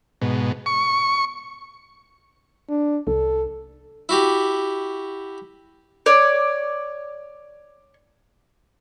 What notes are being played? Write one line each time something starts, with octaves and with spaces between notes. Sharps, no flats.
G#2 B2
C#6
D4
C2 A4
E4 F#4 G4
C#5 D5